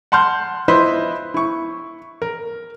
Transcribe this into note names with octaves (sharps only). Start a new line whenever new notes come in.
F#5 A5 C6 F6 G6
E4 F4 B4 C5 D#5 E5
E4 C#6
A#4